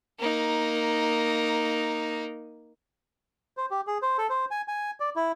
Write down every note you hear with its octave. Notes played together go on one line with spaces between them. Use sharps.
A#3 D#4
C5
G4
G#4
C5
A4
C5
G#5
G#5
D5
E4